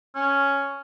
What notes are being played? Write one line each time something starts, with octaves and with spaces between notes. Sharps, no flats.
C#4